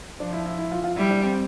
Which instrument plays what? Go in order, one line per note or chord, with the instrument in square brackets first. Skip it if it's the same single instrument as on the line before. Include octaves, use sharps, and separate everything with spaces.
[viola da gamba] F3 [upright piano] D4
[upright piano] E4
E4
E4
F4
F4
[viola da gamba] G3 [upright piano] E4
[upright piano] D4
C4